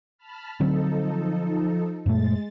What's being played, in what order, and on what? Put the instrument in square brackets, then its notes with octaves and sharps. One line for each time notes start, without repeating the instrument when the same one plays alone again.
[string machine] A5 B5 F6
[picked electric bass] D3 F#3 C4 [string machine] F3 D#4 A4
[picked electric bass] F#2 A#2 A3 [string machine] G#3 A6